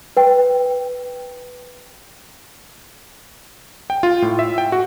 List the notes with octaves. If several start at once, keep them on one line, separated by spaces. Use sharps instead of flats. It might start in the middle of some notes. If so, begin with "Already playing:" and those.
B4 G5
G5
F4
A2
E5
G5
F#4